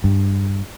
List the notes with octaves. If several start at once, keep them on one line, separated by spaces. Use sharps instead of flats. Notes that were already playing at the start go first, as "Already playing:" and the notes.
G2